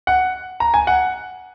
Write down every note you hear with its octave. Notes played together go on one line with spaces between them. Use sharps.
F#5
A#5
G#5
F#5